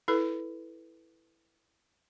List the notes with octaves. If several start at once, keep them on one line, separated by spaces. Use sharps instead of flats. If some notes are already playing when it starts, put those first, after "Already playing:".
E4 A4 B4